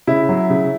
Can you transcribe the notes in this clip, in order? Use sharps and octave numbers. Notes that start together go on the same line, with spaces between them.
C#3 E4
F#3
C#3